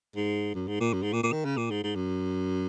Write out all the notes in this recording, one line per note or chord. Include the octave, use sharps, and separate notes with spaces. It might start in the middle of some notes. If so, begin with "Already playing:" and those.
G#2
F#2
G#2
A#2
F#2
G#2
A#2
A#2
D#3
C#3
A#2
G#2
G#2
F#2